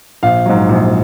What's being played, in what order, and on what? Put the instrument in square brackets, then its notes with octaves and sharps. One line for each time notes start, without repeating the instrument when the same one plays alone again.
[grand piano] A#1 F5
G#2 F#3
A#1